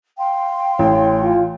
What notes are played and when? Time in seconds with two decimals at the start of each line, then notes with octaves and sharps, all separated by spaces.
0.18 F5 G5 C6
0.79 A1 C#5
1.22 F4